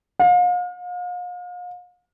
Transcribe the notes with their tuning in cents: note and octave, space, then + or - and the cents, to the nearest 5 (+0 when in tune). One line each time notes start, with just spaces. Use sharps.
F5 +40